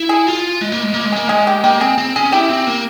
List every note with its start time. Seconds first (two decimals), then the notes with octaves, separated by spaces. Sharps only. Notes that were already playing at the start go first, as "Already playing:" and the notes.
Already playing: E4
0.09 G#4
0.27 F4
0.61 G#3
0.72 A#3
0.83 G#3
0.94 A#3
1.05 G#3
1.12 A#3 G#4
1.28 G#3 G#4
1.47 G4
1.64 A#3 G4
1.81 C4 G#4
1.98 C4
2.16 C#4 G#4
2.32 E4 G4
2.49 C4
2.67 A#3